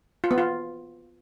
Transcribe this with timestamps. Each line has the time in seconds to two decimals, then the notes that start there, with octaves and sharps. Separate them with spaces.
0.24 F4
0.31 B3
0.38 F4